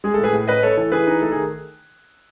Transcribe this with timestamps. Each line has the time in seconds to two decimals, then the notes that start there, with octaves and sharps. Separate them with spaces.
0.04 G#3 G#4
0.14 A4
0.19 A2
0.24 G#4 B4
0.33 A2
0.48 C#4 B4 D#5
0.63 A3 A4 C#5
0.77 E3 A4
0.92 E3 G#4 B4
1.07 D#4
1.21 A3 A4
1.32 G#4
1.36 D#3